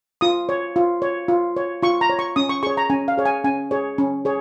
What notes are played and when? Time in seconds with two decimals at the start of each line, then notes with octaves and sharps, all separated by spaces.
0.21 F4 D#6
0.49 C#5
0.76 F4
1.02 C#5
1.28 F4
1.57 C#5
1.82 F4 C#6
2.01 A#5
2.10 C#5
2.19 C#6
2.36 C#4 D#6
2.49 C#6
2.63 G#4 C#5 C#6
2.77 A#5
2.90 C#4 G#5
3.08 F5
3.18 G#4 C#5
3.26 G#5
3.44 C#4 G#5
3.71 G#4 C#5
3.98 C#4
4.25 G#4 C#5